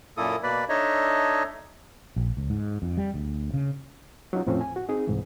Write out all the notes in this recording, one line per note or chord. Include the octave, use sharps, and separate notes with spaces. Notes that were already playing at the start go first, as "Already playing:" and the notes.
F#2 A#2 A#3 E4 A4 D#6
B2 A#3 B4 D5 B5
D4 D#4 A4 C#5 D#5 E5
A#1
C#2
G#2
F2
G3
D2
C#3
F#3 C#4 D#4 F4
E2 A2 F3 C4 C#4
G#5
F#4
C4 D#4 G#4
C2 G#2 E3